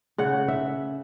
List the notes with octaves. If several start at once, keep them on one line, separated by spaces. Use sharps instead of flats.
C#3 F#5
E5